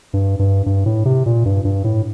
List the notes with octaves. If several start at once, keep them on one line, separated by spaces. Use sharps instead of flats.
G2
G2
G2
A2
C3
A#2
G2
G2
A2